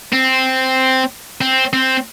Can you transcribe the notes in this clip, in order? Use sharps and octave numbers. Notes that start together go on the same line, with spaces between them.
C4
C4
C4